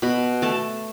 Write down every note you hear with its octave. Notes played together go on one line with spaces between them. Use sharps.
B2 B5
A3 A5